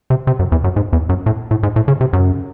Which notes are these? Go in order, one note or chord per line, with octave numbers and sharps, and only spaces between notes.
C3
C3
F#2
E2
F#2
G#2
E2
F#2
A2
A2
G#2
A2
C#3
C3
F#2